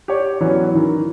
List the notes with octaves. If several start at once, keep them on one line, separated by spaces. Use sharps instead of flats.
G4 C#5 D5
E3 F#3 B3 C#4
D#3 E3